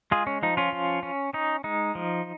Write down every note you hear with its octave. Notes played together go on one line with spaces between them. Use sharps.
G#3 F4 G#4
C#4
F3 D#4
C#4 F4
F3
C#4
C#4 D#4
G#3 D#4
F3